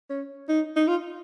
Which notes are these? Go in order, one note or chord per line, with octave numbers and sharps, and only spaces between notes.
C#4
D#4
D#4
F4